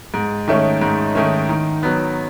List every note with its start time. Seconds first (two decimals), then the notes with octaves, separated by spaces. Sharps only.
0.14 G#2
0.48 D#3 A3 C#4
0.81 G#2
1.15 D#3 A3 C#4
1.49 D#3
1.83 F#3 B3